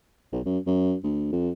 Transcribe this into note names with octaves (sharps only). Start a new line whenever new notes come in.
B1
F#2
F#2
D2
F2